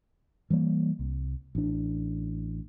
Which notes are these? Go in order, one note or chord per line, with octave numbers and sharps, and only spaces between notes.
E3 G3 G#3 A#3
C2
A1 D4